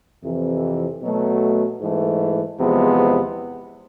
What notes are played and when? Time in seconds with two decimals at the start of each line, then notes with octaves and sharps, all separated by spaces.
0.24 F2 C3 E3
1.03 B2 F#3 A3
1.81 G#2 E3 A3
2.59 E2 C3 F3 G#3 B3